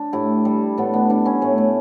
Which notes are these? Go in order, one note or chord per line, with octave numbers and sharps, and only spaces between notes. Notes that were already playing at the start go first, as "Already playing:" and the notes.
Already playing: D4
A2 E4 G4
G3
A2 B3 D4
B3 D4
G3 B3 D4
C#4 E4
A2 A3 C#4
A3